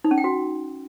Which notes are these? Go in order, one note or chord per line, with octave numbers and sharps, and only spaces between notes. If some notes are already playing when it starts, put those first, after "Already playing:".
D#4
C#4
G5
F#4